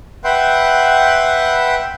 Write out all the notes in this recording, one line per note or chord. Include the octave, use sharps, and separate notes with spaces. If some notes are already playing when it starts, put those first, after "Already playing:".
B4 E5 F#5 G5 C6